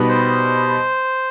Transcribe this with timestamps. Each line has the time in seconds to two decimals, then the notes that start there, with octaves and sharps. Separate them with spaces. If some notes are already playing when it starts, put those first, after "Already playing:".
Already playing: B2 G3 B3 D#4
0.09 C5